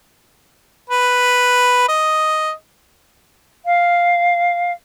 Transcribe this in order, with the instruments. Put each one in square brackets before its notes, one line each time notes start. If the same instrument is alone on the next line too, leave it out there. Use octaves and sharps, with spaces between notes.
[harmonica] B4
D#5
[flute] F5